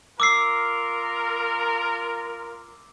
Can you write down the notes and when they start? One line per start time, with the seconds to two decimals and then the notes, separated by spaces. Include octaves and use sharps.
0.20 F4 A#4 D6 E6 C7